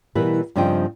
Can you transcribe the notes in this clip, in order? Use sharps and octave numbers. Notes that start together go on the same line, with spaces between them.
B2 E3 G3 E4 A#4 B4
G2 C#3 F3 C4 D#5 G5